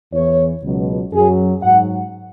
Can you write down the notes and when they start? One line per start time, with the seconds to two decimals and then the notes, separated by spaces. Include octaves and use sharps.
0.13 E2 E3 C#5
0.63 C#2 B2 F#3
1.12 F#2 F#3 G#4
1.62 G#2 F#3 F#5